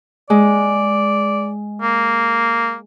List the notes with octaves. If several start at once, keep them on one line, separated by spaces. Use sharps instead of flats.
G#3 D5
A#3